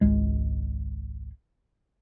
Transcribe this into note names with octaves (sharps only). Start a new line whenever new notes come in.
G#1 C#2 G#3